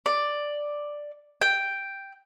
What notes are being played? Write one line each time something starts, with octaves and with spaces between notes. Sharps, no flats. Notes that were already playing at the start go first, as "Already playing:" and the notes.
D5
G5